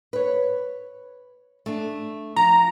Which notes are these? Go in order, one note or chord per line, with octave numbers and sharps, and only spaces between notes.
B4 C#5
A3 D4
F3 A#5